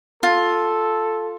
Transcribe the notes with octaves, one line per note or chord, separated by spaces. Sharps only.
F4 A4